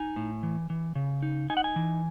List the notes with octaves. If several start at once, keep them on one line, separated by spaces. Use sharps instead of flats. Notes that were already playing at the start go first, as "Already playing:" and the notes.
Already playing: D#4 G#5
A2
E3
E3
C#3
D#4
D#4 G#5
F#5
G#5
E3